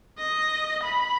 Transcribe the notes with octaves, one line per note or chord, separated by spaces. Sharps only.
D#5
B5